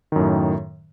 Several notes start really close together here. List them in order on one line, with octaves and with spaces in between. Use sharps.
D#3 F#2 A2